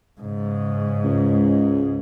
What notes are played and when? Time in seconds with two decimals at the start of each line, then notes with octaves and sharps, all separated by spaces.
0.21 G#2 C#3
1.04 C#2